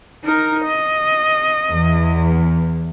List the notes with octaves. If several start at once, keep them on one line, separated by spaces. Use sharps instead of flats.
D#4 A#4
D#5
E2